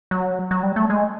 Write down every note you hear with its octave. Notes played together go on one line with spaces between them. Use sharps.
F#3
F#3
G3
A3
G#3